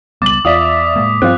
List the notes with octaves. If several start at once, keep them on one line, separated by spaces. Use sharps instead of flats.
C#2 G3 B3 D6 A6 F#7
E2 F4 D5 E5 D#6 B6
A2 G#3 A#3
G2 F3 G3 C4 F4 F#6